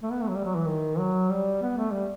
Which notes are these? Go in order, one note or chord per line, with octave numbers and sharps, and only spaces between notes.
A3
B3
A3
F#3
G3
F#3
E3
D#3
F#3
G3
B3
A3
G3